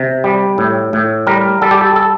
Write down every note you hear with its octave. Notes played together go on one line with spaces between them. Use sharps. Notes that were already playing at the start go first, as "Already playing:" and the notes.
Already playing: C3
G3
A2
A2
G3 A#4
G3 A4
G4
A4
A4